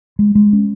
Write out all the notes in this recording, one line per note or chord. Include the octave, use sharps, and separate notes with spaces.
G#3
G#3
C#4